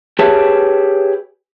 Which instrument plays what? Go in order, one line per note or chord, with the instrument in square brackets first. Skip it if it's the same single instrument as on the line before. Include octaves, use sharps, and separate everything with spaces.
[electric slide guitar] G4 G#4 B4 C#5 E5 A5